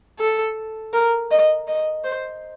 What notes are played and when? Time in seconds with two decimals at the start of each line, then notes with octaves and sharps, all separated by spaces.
0.19 A4
0.93 A#4
1.31 D#5
1.68 D#5
2.05 C5